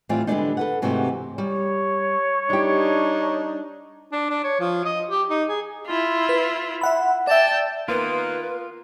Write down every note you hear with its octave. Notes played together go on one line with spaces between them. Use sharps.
A2 E3 G3 C4 F4 D5
D3 G3 G#3 B3 D4 D#4
A4 B4 F#5
G#2 C3 E3 A3 F#4 G4
G3 C#5
G3 D4 D#4 G4
D4
D4
C#5
F3
D#5
G4
D#4
G#4
E4 F4
B4
E5 F#5 B5
D5 E5 G5 A5
D#3 A#3 B3 F4 A#4 B4